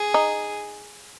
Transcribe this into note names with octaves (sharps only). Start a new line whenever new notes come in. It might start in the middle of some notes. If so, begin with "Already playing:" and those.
Already playing: G#4
D#4